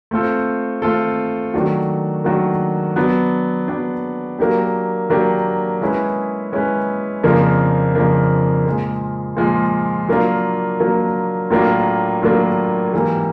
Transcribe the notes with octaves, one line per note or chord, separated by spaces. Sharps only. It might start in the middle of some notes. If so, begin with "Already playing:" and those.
A3 C4 F4 A4
A3 C4 F4 A4
D#3 F#3 A3 D4 F#4
D#3 F#3 A3 D4 F#4
F#3 B3 D4
F#3 B3 D4
F#3 A#3 D4 G4
F#3 A#3 D4 G4
G#3 C#4 E4 G#4 B4
G#3 C#4 E4 G#4 B4
F2 C#3 F3 A#3 D4
F2 C#3 F3 A#3 D4
A#2 F3 G#3
A#2 F3 G#3
F#3 A#3 D4 F4
F#3 A#3 D4 F4
A2 F#3 A#3 D4 F4
A2 F#3 A#3 D4 F4
G#2 E3 G3 A#3